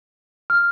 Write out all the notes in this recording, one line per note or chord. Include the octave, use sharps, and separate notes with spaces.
F6